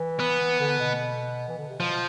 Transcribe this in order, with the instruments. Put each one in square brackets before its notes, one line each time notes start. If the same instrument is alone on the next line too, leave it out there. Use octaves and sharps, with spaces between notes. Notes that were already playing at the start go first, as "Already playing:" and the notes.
Already playing: [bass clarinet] E3
[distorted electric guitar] B3
[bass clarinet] D3
B2
E3
D3
C3
[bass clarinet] B2 [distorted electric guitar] F3